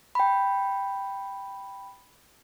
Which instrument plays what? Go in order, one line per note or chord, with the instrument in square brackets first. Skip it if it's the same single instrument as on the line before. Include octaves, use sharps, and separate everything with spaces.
[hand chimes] G5 B5